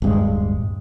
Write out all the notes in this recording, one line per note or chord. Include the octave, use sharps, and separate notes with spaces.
D1 G2 G#3